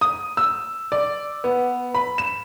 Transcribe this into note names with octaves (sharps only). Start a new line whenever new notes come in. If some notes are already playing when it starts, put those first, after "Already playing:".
D#6
E6
D5
B3
B5
E7